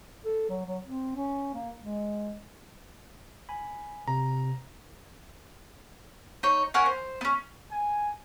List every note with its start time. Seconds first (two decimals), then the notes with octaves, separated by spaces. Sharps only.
0.25 A4
0.49 F#3
0.66 F#3
0.84 C4
1.15 C#4
1.54 A#3
1.81 G#3
3.49 G#5 B5
4.08 C3 A#5
6.43 D#4 C#5
6.74 C#4 A#4 F#5 G#5
6.86 C5
7.21 B3 C#4
7.71 G#5